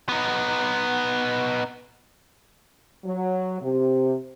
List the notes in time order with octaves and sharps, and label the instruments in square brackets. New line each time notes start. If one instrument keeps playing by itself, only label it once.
[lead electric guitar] B3 D#4
[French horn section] F#3
C3